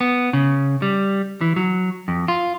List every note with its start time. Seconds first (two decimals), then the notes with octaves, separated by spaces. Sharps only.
0.01 B3
0.33 C#3
0.82 G3
1.41 E3
1.56 F#3
2.08 F2
2.28 F4